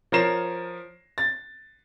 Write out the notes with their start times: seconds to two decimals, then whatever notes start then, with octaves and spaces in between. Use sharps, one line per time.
0.12 F3 A#4 C#5 A#6 C7 E7
1.18 A6